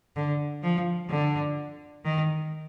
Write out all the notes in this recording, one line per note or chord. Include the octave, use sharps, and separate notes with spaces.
D3
F3
D3
D#3